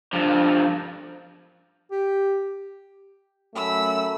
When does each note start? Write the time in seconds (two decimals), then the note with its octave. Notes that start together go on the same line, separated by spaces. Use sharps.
0.13 G2 F3
1.91 G4
3.55 F#2 A3 B5 E6